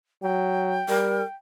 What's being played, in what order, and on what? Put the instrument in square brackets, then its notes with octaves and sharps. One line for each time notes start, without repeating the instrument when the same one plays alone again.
[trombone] F#3 [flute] G5
[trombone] G3 [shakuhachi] A#4